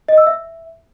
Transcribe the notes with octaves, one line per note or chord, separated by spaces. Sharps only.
D#5
E6
E5